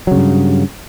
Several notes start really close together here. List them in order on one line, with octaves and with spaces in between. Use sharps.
F#3 C#3 G2